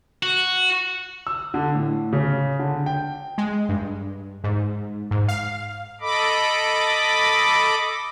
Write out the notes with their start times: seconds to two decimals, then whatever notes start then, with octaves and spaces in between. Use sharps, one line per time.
0.23 F#4
1.27 E6
1.54 D3
1.75 A2
2.13 C#3
2.59 D3
2.86 G5
3.38 G#3
3.69 G2
4.44 G#2
5.11 G#2
5.28 F5
6.01 A4 D#5 B5 D6